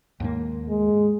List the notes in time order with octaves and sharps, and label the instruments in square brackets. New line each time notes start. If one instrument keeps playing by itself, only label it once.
[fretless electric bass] D#2 G#2 A#3
[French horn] G#3